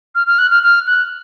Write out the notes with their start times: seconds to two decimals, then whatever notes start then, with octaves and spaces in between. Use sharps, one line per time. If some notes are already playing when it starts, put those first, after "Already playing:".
0.15 F6
0.27 F6
0.38 F#6
0.51 F6
0.63 F6
0.87 F#6